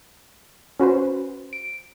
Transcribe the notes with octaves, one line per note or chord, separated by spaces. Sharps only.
C#4 F#4 B4 C5
D7